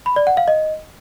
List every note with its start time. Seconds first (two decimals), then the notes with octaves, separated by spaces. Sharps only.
0.06 B5
0.16 D5
0.27 F#5
0.37 F5
0.48 D#5